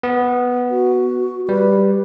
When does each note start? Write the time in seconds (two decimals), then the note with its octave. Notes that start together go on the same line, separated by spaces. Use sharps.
0.03 B3
0.70 F#4
1.49 G3 B4